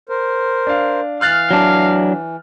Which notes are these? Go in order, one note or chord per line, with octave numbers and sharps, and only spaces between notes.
A#4 C5
D4 F5
E3 F5 F6 F#6 A6
F#3 D4